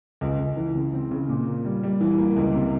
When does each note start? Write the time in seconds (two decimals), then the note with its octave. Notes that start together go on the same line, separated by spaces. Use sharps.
0.21 C#2
0.39 C#2
0.57 E3
0.75 C#3
0.94 C4
1.11 C#3
1.29 A#2
1.47 A#3
1.65 G3
1.83 G3
2.01 E3
2.19 A#3
2.36 C#2
2.54 C3